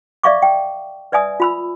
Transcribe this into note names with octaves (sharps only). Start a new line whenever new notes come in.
D5 E5 F5 C#6 D6
G5
B4 D5 E5 G#5 D#6
F4 B5 E6